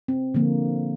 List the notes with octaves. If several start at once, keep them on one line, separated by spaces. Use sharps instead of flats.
C4
D3 F3 A#3